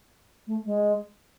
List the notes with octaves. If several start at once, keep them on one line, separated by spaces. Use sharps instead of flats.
A3
G#3